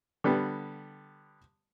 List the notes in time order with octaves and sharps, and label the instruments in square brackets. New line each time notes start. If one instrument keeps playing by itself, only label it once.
[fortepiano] D3 G3 B3